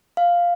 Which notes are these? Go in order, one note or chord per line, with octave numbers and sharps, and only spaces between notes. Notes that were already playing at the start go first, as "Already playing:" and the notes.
F5